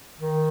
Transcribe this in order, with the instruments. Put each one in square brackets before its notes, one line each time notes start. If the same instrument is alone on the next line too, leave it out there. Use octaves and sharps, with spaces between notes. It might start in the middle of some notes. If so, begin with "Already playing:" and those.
[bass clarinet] D#3